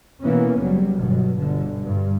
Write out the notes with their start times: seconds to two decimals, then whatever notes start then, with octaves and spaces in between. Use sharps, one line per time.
0.22 B2 E3 A#3 B3 C#4
0.59 F#1 F#3 G3
0.98 G1 G2 B2 F#3
1.37 G1 B2 D3
1.84 G2